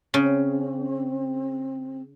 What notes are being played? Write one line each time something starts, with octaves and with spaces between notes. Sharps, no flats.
C#3 C4